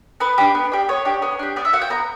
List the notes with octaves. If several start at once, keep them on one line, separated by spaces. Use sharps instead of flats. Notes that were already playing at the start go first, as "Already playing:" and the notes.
B3 B4
D4 G4
B3
D4 G4
B3 C#5
D4 G4
B3
D4 G4
B3 D5
E5
F#4 F#5
G5
B3 A#5